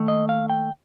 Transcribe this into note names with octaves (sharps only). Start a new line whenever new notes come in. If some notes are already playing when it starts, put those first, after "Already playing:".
Already playing: D#2 D#3 A3
D#5
F5
G5